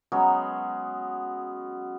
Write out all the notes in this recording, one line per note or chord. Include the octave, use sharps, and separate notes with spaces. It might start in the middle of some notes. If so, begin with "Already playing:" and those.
F#3 G#3 B3 C#4